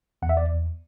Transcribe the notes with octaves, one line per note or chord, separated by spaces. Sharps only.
E2 F#5
E5
D5